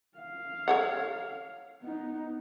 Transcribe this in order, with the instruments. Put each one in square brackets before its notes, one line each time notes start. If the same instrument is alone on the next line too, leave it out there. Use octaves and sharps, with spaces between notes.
[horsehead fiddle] F5
[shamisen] A4 C#5 F#5
[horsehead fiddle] B3 D#4